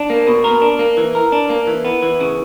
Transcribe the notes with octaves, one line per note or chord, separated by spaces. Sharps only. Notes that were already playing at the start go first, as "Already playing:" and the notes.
Already playing: D4
A#3
B2
A#4
D4
A#3
E3
A#4
D4
A#3
E3
B3
E3
C#3